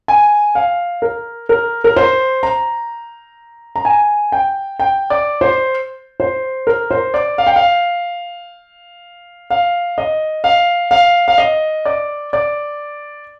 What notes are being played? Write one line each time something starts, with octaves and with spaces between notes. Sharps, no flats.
G#5
F5
A#4
A#4
A#4
C5
A#5
A#5
G#5
G5
G5
D5
C5
C5
A#4
C5
D5
F5
G5
F5
F5
D#5
F5
F5
F5
D#5
D5
D5